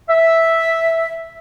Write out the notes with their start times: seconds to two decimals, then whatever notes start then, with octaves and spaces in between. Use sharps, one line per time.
0.09 E5